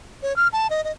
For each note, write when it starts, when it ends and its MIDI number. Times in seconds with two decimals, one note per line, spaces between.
0.23 0.36 73
0.36 0.48 89
0.53 0.67 81
0.70 0.84 75
0.84 0.92 75